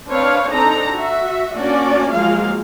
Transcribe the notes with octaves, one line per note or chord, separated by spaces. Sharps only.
C4 D4 B4 C#5 F5
C4 D4 D#4 A4 A#5
F#4 E5
A#3 C#4 D4 F#4 D5
F3 F#3 G#3 A#3 F4 F5